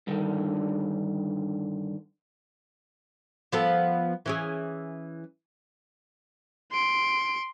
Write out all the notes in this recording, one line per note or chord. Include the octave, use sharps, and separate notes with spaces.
G2 D3 D#3
F3 B3 A4
E3 C#4 G#4
C6 D7